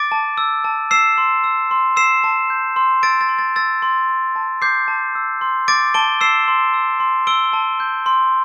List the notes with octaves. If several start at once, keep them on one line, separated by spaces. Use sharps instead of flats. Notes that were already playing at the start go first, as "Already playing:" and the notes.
Already playing: D6 A6 D7
A5
E6
A5
E6 C7 E7
C6
E6
C6
E6 C7 E7
A5
G6
C6
E6 A6 D7
A6
C6
A6
E6 A6
C6
C6
A5
D6 G6 C7
A5
E6
C6
D6 A6 D7
A5 D7 G7
E6 C7 E7
C6
E6
C6
E6 D7 G7
A5
G6
C6